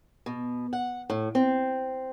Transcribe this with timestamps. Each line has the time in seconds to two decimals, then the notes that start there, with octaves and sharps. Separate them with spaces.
0.26 B2
0.73 F#5
1.10 A2
1.35 C4